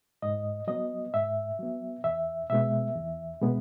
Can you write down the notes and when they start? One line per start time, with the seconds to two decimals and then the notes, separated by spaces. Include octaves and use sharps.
0.22 G#2 D#5
0.67 F#3 B3 D#5
1.13 G#2 E5
1.59 F#3 B3
2.04 E2 E5
2.50 B2 G#3 B3 E5
2.96 E2
3.41 B2 G#3 B3